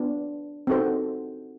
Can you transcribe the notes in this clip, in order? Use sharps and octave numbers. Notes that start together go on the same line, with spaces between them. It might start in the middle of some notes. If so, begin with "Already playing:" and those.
Already playing: B3 D4 F4
C4 D#4 F#4 A4 C5